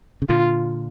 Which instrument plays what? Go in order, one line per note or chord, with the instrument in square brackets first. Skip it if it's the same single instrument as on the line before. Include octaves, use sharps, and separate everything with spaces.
[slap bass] C#3
[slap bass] A#2 D3 [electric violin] F4